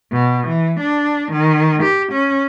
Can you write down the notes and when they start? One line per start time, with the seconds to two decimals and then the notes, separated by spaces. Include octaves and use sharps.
0.13 B2
0.48 E3
0.81 D4
1.32 D#3
1.83 G4
2.13 C#4